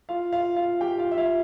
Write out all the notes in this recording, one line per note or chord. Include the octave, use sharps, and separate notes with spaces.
F4 F5
F4 F5
F4 F5
G4 G5
F4 F5
E5
F4 F5